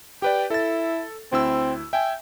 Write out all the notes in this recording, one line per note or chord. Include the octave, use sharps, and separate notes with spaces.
G4 B4 D5 G5
E4 A4 A6
D2 C4 E4 E6
E5 G5 G#5